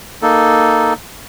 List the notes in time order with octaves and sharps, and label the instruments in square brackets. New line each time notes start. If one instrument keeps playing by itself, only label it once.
[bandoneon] A#3 D#4 A4